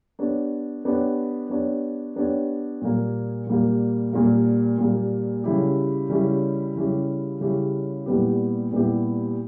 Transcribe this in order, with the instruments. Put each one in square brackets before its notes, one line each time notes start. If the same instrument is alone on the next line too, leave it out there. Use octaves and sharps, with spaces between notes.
[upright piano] B3 D4 G4 C#5
B3 D4 G4 C#5
B3 D4 G4 C#5
B3 D4 G4 C#5
A#2 G3 A#3
A#2 G3 A#3
A#2 G3 A#3
A#2 G3 A#3
C#3 G3 C#4 E4 G4
C#3 G3 C#4 E4 G4
C#3 G3 C#4 E4 G4
C#3 G3 C#4 E4 G4
A#2 G3 B3 E4 G4
A#2 G3 B3 E4 G4